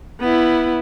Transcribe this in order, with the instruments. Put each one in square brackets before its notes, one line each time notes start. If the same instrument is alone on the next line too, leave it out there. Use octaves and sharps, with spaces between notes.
[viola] B3 E4